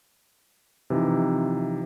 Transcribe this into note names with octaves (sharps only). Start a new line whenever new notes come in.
C3 E3 F3 D#4 F4